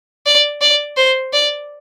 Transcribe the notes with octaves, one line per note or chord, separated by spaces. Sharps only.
D5
D5
C5
D5